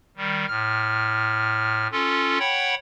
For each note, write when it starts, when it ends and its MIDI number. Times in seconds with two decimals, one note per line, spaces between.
0.17 0.46 51
0.17 0.46 55
0.48 1.87 45
0.48 1.87 89
1.92 2.38 61
1.92 2.38 65
1.92 2.38 69
2.39 2.75 73
2.39 2.75 78
2.39 2.75 79
2.39 2.75 83